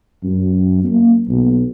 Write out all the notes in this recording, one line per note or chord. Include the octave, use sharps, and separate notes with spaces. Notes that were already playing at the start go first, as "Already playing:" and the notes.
F#2
A#3
B1